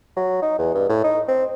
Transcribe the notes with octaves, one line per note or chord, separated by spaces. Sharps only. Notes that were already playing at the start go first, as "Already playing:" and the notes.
F#3
D#4
E2
G2
A2
D#4
C4